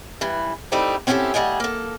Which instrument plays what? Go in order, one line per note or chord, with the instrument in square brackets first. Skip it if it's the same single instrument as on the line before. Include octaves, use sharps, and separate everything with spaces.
[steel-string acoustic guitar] G2 E3
G3 A3 C4 D#4 E4 G4
C4 C#4 E4 F#4 G4 A4
D3 G3 A3 D#5 G#5
A#3 A4